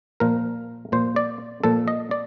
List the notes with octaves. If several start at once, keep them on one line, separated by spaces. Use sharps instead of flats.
A#2 F3 A#4
A#2 F3 C5
D5
A#2 F3 A4
D#5
D5